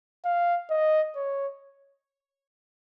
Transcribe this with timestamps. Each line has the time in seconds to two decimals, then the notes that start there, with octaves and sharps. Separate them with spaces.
0.25 F5
0.70 D#5
1.16 C#5